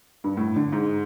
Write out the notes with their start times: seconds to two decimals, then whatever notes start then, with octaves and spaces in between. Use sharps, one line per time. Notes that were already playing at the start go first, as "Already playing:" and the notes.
0.24 G2
0.37 A2
0.56 D3
0.73 G#2